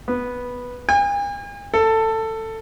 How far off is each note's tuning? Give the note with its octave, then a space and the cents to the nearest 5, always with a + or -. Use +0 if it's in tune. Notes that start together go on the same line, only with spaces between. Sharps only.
B3 -5
G#5 -45
A4 +15